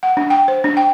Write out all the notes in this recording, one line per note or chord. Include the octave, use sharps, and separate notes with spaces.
F#5
D4
G5
C5
D4
G5